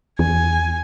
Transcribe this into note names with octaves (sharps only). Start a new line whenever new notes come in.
E2 G#5